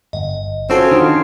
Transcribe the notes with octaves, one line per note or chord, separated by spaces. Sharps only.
G1 D#5
C4 C#4 F4 F#4 A4 C#5 E6
D#3 D4 D#4 F4